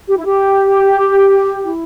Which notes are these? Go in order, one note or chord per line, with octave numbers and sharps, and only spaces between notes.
G4
E4
G4
E4